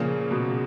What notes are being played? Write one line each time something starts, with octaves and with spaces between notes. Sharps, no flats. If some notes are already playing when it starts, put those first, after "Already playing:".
Already playing: A#2 C#3 F3 A#3
B2